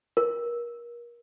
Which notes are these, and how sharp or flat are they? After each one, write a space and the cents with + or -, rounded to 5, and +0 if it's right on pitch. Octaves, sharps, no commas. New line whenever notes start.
A#4 +30